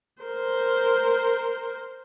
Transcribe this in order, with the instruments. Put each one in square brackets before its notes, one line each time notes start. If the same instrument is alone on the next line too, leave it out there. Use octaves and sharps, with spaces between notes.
[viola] A#4 C5